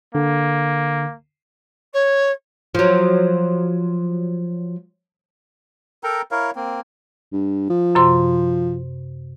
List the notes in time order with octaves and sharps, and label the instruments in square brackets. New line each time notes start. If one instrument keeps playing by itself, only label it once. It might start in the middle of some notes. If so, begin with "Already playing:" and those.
[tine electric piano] D3 [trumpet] A#3
[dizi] C#5
[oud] F3 F#3
[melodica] A4 A#4 G5 A#5
E4 A#4 C#5 F5
A#3 C4
[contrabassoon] G2
F3
[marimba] F#2 C3 C6